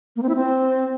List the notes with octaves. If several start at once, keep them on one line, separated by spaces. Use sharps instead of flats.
A#3
C4
E4
C4